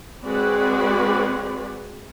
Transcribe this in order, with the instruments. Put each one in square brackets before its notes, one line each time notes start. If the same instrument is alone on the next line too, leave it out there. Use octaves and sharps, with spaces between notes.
[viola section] G#3 C4 F#4 G#4 B4 D5